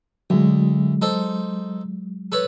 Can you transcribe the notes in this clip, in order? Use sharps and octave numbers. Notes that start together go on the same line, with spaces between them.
D2 F#3 G#3
D#4 A4 C5
A4 B4 C#5